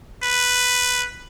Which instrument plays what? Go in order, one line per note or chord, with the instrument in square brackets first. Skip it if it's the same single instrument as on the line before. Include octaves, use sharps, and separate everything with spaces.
[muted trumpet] B4